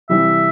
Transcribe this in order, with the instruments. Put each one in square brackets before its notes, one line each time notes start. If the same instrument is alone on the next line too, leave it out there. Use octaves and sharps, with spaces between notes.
[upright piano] C3 E3 G3 C4 E4 [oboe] E5